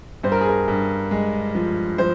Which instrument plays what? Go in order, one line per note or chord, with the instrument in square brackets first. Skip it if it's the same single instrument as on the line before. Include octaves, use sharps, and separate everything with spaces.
[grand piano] G2 C5
A#4
G#4
A#4
G2
G#3
F3
F3 C5